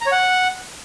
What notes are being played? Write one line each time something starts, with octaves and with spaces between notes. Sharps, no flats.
A#5
C#5
F#5